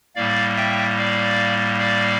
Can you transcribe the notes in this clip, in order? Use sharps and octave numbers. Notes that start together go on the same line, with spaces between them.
A2 G3 A#3 D5 F5
E5 G5
D5 F5
D5 F5